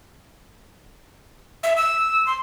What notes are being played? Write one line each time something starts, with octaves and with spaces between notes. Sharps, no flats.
E5
E6
C6